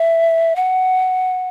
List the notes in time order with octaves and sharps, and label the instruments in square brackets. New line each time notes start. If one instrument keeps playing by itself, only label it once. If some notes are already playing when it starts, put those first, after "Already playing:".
Already playing: [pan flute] E5
F#5